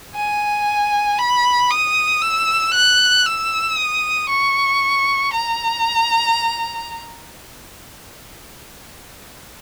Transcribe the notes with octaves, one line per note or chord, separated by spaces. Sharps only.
G#5
B5
D#6
E6
F#6
E6
D#6
C#6
A#5